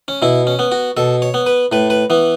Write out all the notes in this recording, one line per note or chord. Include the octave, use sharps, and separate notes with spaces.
C#4
B2 E4
C#4
B3
F#4
B2 A4
C#5
B3
B4
A2 B4
B4
E3 B3